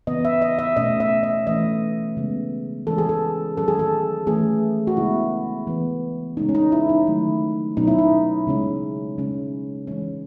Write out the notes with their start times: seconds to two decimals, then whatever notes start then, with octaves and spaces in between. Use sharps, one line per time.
0.07 C#3 E3 B3 D#5
0.25 E5
0.42 D#5
0.59 E5
0.77 B2 A3 C#4 D#5
1.00 E5
1.23 D#5
1.47 E3 A3 C#4 D#5
2.17 C#3 G#3 B3
2.87 E3 G#3 C#4 A4
2.98 G#4
3.09 A4
3.57 D#3 F#3 C#4 A4
3.68 G#4
3.79 A4
4.27 E3 A3 C#4 G#4
4.87 F#4
4.97 C#3 G#3 B3 E4
5.67 E3 B3
6.37 C#3 G#3 C#4 D#4
6.49 C#4
6.55 D#4
6.72 E4
6.89 D#4
7.07 D#3 F#3 A3 C#4
7.77 B2 F#3 C#4 D#4
7.87 E4
7.99 D#4
8.47 C#3 G#3 C#4
9.18 C#3 G#3 C#4
9.87 E3 G#3 C#4